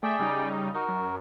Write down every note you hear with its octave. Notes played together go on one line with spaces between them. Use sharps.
A3 G#4 D5 E5 G5
C#3 G3 D#4
D#4 F#4 A#4
F#2